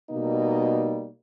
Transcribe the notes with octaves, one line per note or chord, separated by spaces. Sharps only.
B2 G3 A#3 D#4